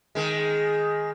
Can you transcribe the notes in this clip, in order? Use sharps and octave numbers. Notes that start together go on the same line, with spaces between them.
D#3 G#3